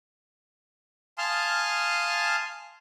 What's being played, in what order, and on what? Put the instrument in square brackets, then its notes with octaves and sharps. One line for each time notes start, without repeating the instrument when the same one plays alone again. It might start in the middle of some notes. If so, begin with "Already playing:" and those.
[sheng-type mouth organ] F5 G#5 A5 C6 D#6 F6